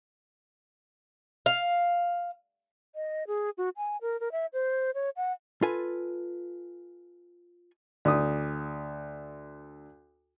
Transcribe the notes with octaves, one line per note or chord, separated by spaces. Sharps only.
F5
D#5
G#4
F#4
G#5
A#4
A#4
E5
C5
C#5
F#5
F4 A4 B4 G#5
D2 D#6